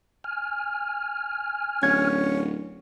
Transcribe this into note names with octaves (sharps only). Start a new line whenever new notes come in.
G#5 F6
D1 C#4 G#6